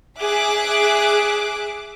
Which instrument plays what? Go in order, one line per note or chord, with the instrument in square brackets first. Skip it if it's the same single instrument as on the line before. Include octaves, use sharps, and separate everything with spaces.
[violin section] G#4 E5 D6 F#6